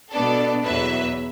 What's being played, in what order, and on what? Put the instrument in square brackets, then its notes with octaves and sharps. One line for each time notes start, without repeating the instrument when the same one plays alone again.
[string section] B2 B3 D4 A4 D5
E2 B2 F#3 B4 E5